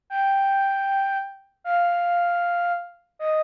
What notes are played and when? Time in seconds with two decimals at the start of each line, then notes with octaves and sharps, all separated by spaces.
0.10 G5
1.64 F5
3.19 D#5